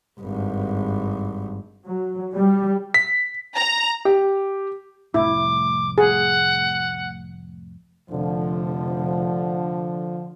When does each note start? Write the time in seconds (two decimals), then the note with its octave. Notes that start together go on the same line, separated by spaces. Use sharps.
0.20 G#1 G2
1.86 F#3
2.35 G3
2.94 B6
3.57 A#5
4.05 G4
5.14 F1 C2 A2 E4 D6
5.98 G#4 F#5
8.10 F1 D3 F3